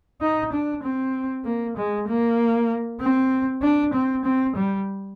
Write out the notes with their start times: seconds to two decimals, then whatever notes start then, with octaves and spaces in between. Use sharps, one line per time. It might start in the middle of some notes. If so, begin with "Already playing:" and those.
0.21 D#4
0.52 D4
0.83 C4
1.45 A#3
1.76 G#3
2.07 A#3
3.00 C4
3.62 D4
3.93 C4
4.24 C4
4.55 G3